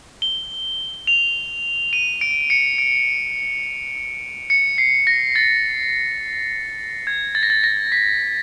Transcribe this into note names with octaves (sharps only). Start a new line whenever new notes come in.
G7
F7
D#7
D7
C#7
D7
C#7
C7
A#6
A6
G#6
A6
A#6
A6
A#6
B6